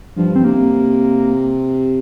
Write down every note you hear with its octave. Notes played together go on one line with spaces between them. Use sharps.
G2 F3
C4
C3 A#3